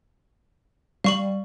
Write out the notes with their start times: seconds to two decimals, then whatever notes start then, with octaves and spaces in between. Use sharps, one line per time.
1.04 G3 F5 C#6 F#7